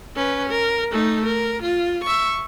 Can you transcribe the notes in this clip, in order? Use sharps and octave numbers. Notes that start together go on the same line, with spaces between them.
C#4 B4
A#4
A3 D#4
A#4
F4
E5 C#6